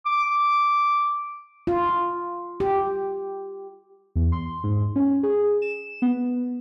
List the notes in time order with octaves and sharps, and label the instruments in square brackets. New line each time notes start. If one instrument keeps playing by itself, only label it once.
[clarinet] D6
[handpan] F4
G4
[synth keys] E2
C6
G#2
C#4
G#4
E7
B3